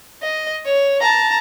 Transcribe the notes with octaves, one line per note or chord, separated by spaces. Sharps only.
D#5
C#5
A5 A#5